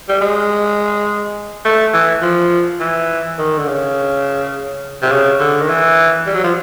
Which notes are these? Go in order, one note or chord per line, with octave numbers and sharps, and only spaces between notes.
G3
G#3
A3
E3
F3
E3
D#3
D3
C#3
C3
C#3
D3
D#3
E3
G3
F#3
F3